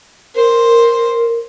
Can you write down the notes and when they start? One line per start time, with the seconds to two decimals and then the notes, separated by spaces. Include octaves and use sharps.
0.35 A#4 C5